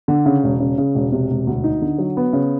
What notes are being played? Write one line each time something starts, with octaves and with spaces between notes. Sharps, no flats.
D3
C#3
E1
C#3
C#3
E1
C3
E1
D2
D#4
D3
F#3
B3
C#3